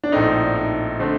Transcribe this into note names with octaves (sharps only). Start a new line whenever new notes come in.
D4
A#1 A2 A3 C4 D#4
D#4
D3 A3 C4